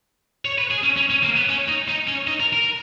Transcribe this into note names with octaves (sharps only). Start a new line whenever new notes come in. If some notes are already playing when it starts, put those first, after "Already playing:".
C#5
B4
G#4
C#4
C#4
C#4
A#3
B3
C#4
D#4
D#4
C#4
D#4
A#4
A#4